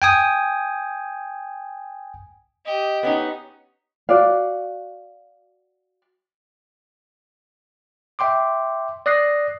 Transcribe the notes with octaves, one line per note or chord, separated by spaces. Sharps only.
G5 G#5 D#6
G4 D#5
B3 C#4 D#4
F#4 D5 F5
E5 G5 C6 D6
D5 D#6 F#6 A#6 C7